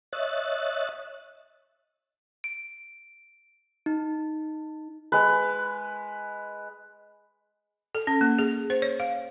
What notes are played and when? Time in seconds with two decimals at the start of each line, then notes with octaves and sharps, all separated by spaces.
0.13 C#5 D#5 E5 F#6 A6
2.44 D7
3.86 D#4
5.12 G#3 B4
7.95 A4
8.07 C#4
8.21 A#3
8.39 G#4
8.70 C5
8.82 C#5
9.00 F5